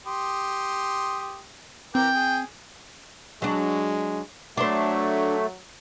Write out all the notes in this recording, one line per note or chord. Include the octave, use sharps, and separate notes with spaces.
G4 C6 D#6
E3 C4 A#4 G5 D6
G#4
F#3 G#3 D4
F#3 A3 D4 C5